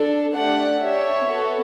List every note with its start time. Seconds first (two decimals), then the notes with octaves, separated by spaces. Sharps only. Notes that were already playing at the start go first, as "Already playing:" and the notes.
Already playing: D4 A4
0.34 A3 D4 G4 D5 F#5
0.80 D4 G4 C#5 E5
1.26 B3 F#4 A4